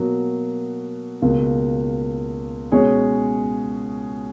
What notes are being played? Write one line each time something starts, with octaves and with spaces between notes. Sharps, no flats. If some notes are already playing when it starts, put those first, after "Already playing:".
Already playing: B2 F#3 A#3
C#2 B2 A#3
B2 G#3 C#4 G#4 C#5